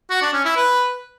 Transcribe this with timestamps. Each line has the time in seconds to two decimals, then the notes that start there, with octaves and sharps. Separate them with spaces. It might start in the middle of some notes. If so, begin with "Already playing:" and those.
0.10 F#4
0.22 D4
0.33 C#4
0.45 E4
0.56 B4